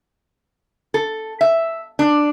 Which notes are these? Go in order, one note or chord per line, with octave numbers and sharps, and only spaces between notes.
A4
E5
D4